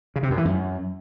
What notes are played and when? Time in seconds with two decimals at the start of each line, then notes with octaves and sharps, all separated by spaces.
0.16 C#3
0.23 C3
0.30 F#2
0.38 E3
0.45 F#2